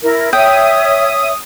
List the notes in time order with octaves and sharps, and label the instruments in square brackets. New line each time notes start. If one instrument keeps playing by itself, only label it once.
[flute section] E4 A#4
[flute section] C#5 E5 [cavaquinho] G5 [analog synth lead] D#6